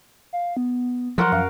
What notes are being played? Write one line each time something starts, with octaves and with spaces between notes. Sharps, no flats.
F5
B3
F3 F#3 F#4 A#4 F#5 C6
F#2 F5